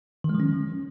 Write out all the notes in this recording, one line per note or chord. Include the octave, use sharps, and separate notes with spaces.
D#3
G#3
F3
C#4